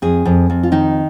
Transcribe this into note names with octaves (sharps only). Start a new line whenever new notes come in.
F2 G#4
F2
F2
F4
D#3 D#4